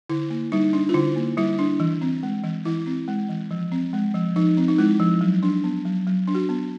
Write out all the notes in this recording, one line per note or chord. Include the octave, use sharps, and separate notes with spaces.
D3 E4
A#3
G3 D#4
D4
F4
D3 E4
A#3
G3 E4
D4
E3
C4
G#3
E3
E3 E4
C4
G#3
E3
F3
C4
G#3
F3
F3 D#4
C4
D#4
G#3 E4
F3
F#3
D4
B3
F#3
F#3
D4
F#4
B3